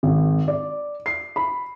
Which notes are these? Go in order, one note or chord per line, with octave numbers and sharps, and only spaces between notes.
G#1
D5
C7
B5